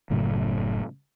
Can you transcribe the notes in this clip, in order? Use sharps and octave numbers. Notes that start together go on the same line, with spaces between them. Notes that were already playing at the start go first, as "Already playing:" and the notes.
F#1 A2 C#3 F#3